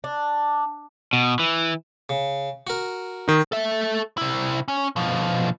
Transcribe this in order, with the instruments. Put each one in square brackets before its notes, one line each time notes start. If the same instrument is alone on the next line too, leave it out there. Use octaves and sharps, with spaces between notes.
[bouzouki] D4
[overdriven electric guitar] B2
E3
[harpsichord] C#3
F#4 A#4
[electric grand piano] D#3 D#4
[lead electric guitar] A4 E5
C3 E4
C#4
B2 F3